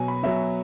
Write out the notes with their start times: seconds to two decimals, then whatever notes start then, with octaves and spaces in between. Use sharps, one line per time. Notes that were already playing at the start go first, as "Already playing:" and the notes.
Already playing: B2 F#3 G#5
0.08 B5
0.23 B2 F#3 E5